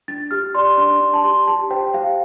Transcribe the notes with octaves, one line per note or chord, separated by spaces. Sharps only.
D4 A6
G4 F6
D5 C6
D4 C6
D4
A5
G4 C6
G4 A5
C5 G5
G4 F5